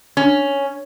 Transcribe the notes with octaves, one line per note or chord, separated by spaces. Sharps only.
C#4